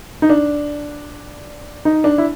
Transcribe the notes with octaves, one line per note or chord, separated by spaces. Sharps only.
D#4
D4
D#4
D4
E4